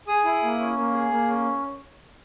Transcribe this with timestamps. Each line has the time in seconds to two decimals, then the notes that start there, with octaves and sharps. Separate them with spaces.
0.08 G#4 D#6
0.25 E4
0.43 A#3
0.59 C#4
0.77 A#3
0.93 G#4
1.11 A#3
1.28 C#4